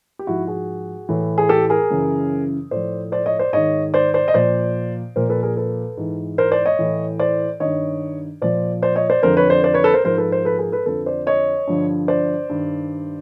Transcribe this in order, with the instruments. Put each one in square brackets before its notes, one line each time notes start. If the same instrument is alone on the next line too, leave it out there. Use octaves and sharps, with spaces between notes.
[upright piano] G4
G#2 F3 E4 F#4
F#4 G#4
A2 E3
G#4
G4 A4
G#4 A#4
F#2 C#3 E3
A2 F3 C5 D5
C5 D5
C#5 D#5
C5 D5
G#2 D#3 C#5 D#5
C5 D5
C5 D5
D#5
A#2 F3 C5 D5
A#2 F3 A#4 C5
A4 B4
G#4 A#4
A4 B4
G#2 E3
A#4 C5
C5 D5
C#5 D#5
A2 E3
C5 D5
G2 D#3 C#5 D#5
A#2 F3 C5 D5
C5 D5
C#5 D#5
C5 D5
F2 D3 F3 A#4 C5
B4 C#5
C5 D5
C5 D5
B4 C#5
A4 B4
A#4 C5
G#2 F3 A#4 C5
A4 B4
A#4 C5
A4 B4
G#4 A#4
A4 B4
F2 D3 F3 A4 B4
C5 D5
C#5 D#5
G2 D3 F3
C5 D5
G2 D#3